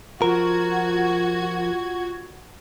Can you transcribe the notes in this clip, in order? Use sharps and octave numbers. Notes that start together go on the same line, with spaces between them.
F3 F4 F#4 A#4 G#6